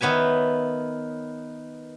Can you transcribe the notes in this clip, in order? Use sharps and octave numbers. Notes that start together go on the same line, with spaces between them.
D#3 B3 C#5 E5 G#5